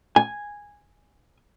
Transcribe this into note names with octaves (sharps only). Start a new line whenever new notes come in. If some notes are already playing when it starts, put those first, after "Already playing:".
G#5